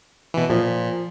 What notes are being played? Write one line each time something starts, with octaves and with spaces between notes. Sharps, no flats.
B2 E3
A#2 F3